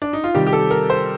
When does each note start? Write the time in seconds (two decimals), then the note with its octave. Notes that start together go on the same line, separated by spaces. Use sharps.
0.02 D4
0.13 D#4
0.24 F4
0.34 C3 D#3 G3 G4
0.47 G4
0.53 A4
0.71 A#4
0.90 C5